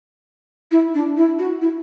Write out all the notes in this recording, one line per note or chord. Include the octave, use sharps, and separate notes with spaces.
E4
D4
E4
F#4
E4